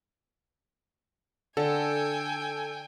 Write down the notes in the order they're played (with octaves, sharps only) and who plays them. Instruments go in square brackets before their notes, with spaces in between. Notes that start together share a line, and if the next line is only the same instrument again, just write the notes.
[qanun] D3 [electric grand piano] A4 [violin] G5 G#5